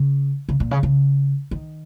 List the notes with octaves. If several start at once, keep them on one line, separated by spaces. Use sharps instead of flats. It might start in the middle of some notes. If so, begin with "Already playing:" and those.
Already playing: C#3
C#3
A#2
C#3
C#3
D#3